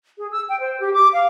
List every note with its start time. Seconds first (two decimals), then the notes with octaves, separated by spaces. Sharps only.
0.18 G#4
0.30 E6
0.48 G5
0.60 C5
0.80 G4
0.93 D6
1.13 F5